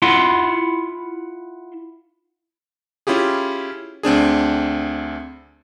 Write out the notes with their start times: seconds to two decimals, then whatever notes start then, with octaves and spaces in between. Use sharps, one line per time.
0.02 E4 F4 F#5 C6
3.07 C#4 E4 F4 G4 G#4
4.03 D2 C4 D4 G#4